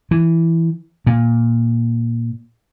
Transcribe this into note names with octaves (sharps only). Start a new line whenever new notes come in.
E3
A#2